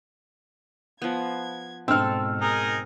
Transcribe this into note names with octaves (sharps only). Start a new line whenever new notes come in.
F3 B3 G#6
G#2 B2 C4 A4 E6 F6
D#4 G#4 A#4